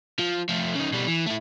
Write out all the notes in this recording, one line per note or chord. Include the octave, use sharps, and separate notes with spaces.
F3
F3 A3
C#3 D#4
B2 G3
E3
A3 E4